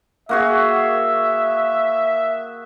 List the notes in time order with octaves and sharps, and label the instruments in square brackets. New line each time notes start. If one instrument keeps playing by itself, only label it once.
[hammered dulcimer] A#3 F#4 G#4 [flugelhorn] E5